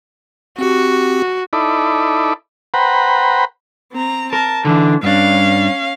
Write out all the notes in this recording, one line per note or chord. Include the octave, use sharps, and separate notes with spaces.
C4 F#4 G4
D#4 E4 A4 D5 B5
B4 C5 F#5 G5 A#5 B5
C4 A#5
A#4 A5
D3 E3 D4
G2 C#4 D4 F5